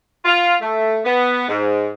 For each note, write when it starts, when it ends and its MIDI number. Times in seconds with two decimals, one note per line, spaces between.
0.25 0.53 65
0.60 0.96 57
1.05 1.45 59
1.48 1.90 44